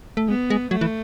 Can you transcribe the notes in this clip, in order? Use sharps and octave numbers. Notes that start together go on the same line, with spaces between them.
A3
G#3 B3
G#3
F#3 A3
E3